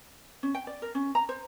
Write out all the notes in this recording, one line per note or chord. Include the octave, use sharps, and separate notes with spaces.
C#4
G5
D5
A#4
C#4
A#5
C5